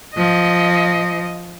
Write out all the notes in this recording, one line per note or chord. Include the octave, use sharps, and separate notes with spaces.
F3 D#5